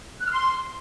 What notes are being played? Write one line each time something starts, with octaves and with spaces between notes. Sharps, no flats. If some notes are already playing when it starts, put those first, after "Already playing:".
F#6
F6
C6